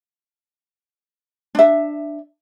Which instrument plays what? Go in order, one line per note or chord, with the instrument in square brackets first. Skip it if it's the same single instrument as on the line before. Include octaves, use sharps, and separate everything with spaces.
[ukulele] D4 E5